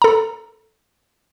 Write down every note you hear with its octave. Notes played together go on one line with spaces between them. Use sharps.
A4 A#5